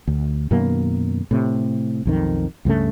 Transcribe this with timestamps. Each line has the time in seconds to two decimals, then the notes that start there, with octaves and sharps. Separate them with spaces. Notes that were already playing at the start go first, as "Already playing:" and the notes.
0.08 D2
0.51 F#2 B2 D#3 A#3
1.31 A2 C3
2.05 B1 F2 D#3
2.65 C#2 G2 C#3 A3